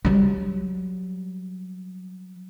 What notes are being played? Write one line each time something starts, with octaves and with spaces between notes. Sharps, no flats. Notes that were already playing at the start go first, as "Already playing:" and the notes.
F#3 G3